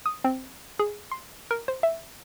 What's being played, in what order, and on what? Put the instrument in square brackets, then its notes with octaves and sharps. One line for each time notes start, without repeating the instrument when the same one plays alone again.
[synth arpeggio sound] D#6
C4
G#4
C6
A#4
C5
E5